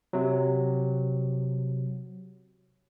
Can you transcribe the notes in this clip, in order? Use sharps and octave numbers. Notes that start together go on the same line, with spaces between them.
C3 F#3